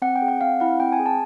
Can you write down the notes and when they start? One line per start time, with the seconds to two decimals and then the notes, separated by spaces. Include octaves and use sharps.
0.02 C4 F#5
0.16 G5
0.22 G#4
0.28 F#5
0.41 C4 F5
0.60 E4 F#5
0.80 C4 G5
0.92 G#5
1.00 G#4
1.06 A5